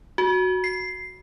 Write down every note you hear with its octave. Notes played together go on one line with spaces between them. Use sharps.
F#4
C7